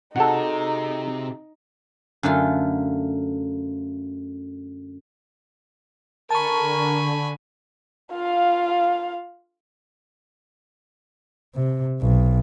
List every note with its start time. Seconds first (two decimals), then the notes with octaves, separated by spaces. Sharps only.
0.16 C3 C4 D#4 F#4 G#4 A4 F#5
2.23 F#2 D3 A3 F4
6.30 D3 A#4 G#5 A5 B5 C#6
8.12 F4 F5
11.55 C3
12.02 B1